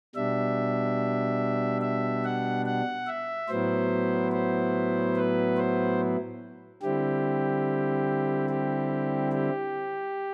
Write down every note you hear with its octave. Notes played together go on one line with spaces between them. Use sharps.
B2 G3 D4 E5
E5
F#5
F#5
E5
A2 F#3 B3 E4 C5
C5
B4
C5
D3 G3 C4 E4 G4
G4
G4